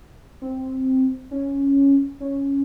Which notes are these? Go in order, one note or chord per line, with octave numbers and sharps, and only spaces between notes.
C4
C#4
C#4